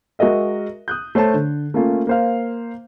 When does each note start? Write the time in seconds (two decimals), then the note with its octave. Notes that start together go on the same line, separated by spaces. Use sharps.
0.19 G#3 F#4 A#4 D#5 E5
0.88 D#6 F#6 G6
1.15 A3 C5 C#5 A5
1.34 D3
1.74 A3 A#3 C#4 F4
2.07 A#3 C5 F5